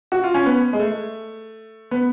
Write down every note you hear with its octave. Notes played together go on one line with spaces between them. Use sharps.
F#4
F4
C#4
B3
G#3
A3
B3